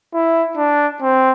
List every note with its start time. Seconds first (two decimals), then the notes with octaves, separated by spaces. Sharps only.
0.14 E4
0.57 D4
1.02 C4